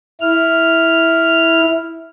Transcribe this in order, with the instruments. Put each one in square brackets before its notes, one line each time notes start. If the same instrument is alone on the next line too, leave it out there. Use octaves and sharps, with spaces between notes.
[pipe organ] E4 F6